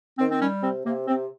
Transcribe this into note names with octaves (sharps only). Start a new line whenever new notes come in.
D#3 C4
C4
G3 C#4
C3 C4
C3 A#3
C3 C4